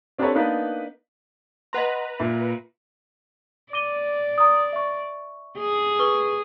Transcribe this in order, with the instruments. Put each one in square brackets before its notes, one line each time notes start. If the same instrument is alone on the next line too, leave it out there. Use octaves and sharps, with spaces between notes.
[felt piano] C4 D4 G4 A4 B4 C#5
A#3 B3 D4 D#4 B4
[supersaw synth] B4 A#5 [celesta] D#5 F#5 C6
[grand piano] A#2 [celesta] E5
[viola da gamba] D5 [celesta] D6 D#7 G7
[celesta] A#5 D#6
E5 C#6
[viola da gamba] G#4
[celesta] B4 C#6 G7